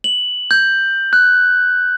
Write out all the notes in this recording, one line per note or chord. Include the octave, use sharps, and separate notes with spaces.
F#7
G6
F#6